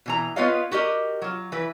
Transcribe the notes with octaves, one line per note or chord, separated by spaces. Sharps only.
B2 E3 A#5
B3 F4 B4 C#5 D#5 F5
F#4 G4 A#4 D#5
F#3 F4
E3 B4